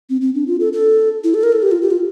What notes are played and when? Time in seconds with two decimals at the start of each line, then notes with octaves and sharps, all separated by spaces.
0.10 C4
0.21 C4
0.35 D4
0.47 F4
0.60 A4
0.73 A4
1.24 E4
1.34 A4
1.43 A#4
1.52 A4
1.63 G4
1.72 F4
1.82 G4
1.91 F4